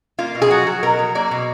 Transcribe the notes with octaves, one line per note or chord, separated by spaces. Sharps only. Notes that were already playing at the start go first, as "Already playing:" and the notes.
A#3 F4
B2
G#4
F#3 F#4
F#3
B2 A#4
F#3
A#3 D5
B2